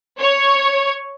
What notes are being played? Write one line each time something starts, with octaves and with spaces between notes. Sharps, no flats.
C#5